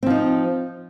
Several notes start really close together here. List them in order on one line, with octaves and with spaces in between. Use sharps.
C4 F3 D#4